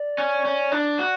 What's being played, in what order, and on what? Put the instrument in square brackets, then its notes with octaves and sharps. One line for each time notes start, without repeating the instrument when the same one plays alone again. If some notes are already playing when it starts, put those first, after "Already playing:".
Already playing: [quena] D5
[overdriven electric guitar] C#4
C#4
D4
F#4